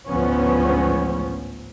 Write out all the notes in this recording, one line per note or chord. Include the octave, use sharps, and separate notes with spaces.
A1 D2 G#2 F3 B3 C#4